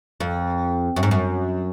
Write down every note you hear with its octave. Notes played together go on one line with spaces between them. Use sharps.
F2
F#2
G#2
F#2